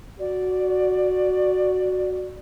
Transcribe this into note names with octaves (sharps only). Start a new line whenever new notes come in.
F#4 D5